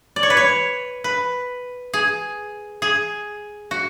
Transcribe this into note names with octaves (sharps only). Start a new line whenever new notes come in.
D5
C#5
B4
C#5
B4
G#4
G#4
F#4